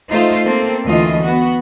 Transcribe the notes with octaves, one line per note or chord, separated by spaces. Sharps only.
A3 D#4 F4 C5
A#3 C4 A4
D2 E3 A3 F4 D#5
B3 F#4